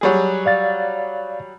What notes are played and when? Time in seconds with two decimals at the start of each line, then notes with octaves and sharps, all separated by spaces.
0.01 F#3 G3 G#4
0.46 D5 F5 A6